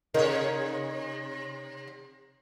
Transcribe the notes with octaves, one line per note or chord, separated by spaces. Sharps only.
C3 D#4 A#4 C#5